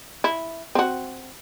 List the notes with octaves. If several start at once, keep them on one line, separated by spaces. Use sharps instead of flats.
E4
C4 F#4